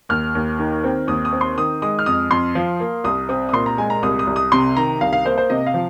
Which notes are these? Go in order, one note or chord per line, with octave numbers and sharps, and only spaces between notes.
D#2 F6
D#2
D#3
C4
D#2 D#6
D#6
C4
C6
D#3 D#6
G#3 D#6
F6
F2 D#6
F2 C6
F3
A#3
C2 D#6
C4 D#6
D#6
A#2 C6
A#5
G#3 G#5
A#5
C2 D#6
D#6
C2
D#6
C3 C6
D#3 A#5
C2 F5
F5
A#3 C5
C5
C3 D#5
F5
F3